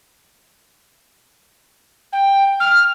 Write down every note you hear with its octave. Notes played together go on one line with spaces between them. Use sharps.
G5
F6